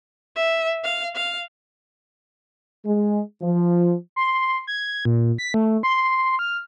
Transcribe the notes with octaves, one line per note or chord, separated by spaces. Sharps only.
E5
F5
F5
G#3
F3
C6
G#6
A#2
B6
A3
C6
F6